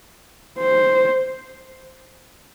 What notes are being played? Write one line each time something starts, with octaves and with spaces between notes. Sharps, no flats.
C5